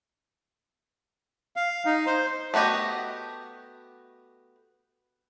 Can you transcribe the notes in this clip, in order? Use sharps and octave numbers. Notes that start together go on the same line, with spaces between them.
F5
D#4
C5
A3 B3 F#4 G4 D#5